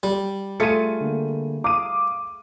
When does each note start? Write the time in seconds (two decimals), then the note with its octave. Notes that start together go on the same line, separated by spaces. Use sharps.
0.03 G3
0.60 A3 F4 G#4 C#7 D#7
1.01 D3 A#3
1.64 F5 D6 D#6 D#7